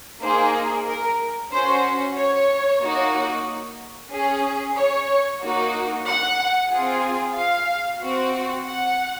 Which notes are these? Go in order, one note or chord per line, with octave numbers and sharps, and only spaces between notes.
A#3 D#4 G#4 C5
A#4
C#4 F#4 C5
C#5
A#3 D#4 F#4
C#4 G#4
C#5
A#3 D#4 F#4
F#5
C4 F4 G#4
F5
C4 F#4
F#5